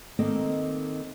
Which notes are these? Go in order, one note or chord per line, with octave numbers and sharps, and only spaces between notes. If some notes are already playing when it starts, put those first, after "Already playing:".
D#3 A#3 C4 A4 D#5